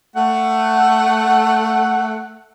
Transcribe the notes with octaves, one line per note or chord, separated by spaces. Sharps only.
A3 F#5